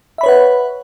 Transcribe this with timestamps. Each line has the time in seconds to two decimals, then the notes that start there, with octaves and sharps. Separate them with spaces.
0.18 E5
0.21 B5
0.23 C#5
0.26 B4
0.29 F#5